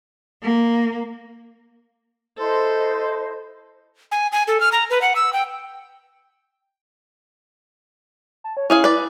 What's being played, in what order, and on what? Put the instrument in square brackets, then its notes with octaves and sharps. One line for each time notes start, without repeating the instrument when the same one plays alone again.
[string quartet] A#3
[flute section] E4 C5 D#5 [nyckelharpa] A4
[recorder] G#5
G#5
A4
F6
A#5
B4
F#5
E6
G5
[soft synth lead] A5
C#5
[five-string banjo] C#4 G#4 F5 [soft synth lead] E4
[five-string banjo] B4 D5